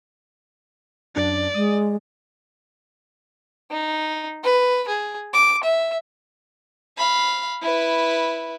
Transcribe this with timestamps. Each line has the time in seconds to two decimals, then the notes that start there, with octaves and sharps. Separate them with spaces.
1.16 F#2 D4 D5
1.54 G#3 D#6
3.71 D#4
4.44 B4
4.88 G#4
5.34 D6
5.63 E5
6.97 F5 B5
7.62 E4 B4